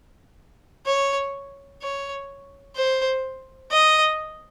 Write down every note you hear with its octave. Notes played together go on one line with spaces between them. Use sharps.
C#5
C#5
C5
D#5